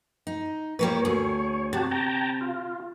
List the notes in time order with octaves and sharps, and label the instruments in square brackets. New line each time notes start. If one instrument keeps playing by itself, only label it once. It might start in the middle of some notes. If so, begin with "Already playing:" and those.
[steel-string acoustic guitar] D#4
[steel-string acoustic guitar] G3 A#3 B4 [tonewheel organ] C#5
[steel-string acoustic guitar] D2 G#4
[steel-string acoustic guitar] C3 [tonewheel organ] F#4 G4 A5
[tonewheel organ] G5 A5 A#5
F4